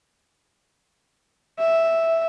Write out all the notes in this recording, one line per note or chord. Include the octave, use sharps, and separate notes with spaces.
E5